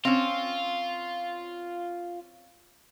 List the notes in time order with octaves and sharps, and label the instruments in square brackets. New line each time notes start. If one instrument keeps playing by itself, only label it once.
[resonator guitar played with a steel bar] C4 C#4 [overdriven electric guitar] F4